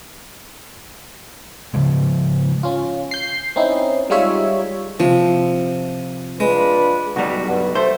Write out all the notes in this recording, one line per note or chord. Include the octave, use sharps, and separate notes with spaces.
C#3 F3 G#3
C#4 F4
G6 C7
C4 C#4 D#4 E4
G3 G#3 D#4 F4 C#5 E5
C3 F3
G#3 D4 F4 B4
B1 G3 F#4
G2
A3 C5